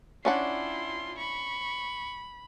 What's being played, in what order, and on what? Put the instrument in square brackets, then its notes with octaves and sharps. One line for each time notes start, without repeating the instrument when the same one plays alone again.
[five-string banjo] C#4 D4 F#5 [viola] E4 F4 [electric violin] C6
[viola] B5 [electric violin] C#6